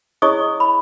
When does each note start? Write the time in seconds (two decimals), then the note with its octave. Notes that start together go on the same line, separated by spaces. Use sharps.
0.22 E4 G#4 C#5 D#5 C#6 D#6
0.60 B5